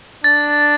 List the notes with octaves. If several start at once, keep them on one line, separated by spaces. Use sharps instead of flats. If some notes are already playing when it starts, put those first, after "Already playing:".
D4 A6